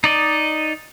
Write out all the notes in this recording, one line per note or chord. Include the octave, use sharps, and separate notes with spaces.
D#4 D5 D#5